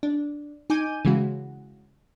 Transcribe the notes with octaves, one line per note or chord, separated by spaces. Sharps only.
D4
D#4 G#5 D6 G6 D#7
C#3 E3 G#3 F#4